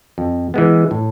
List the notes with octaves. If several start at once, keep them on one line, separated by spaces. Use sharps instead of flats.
F2
E3 G#3 B3
A2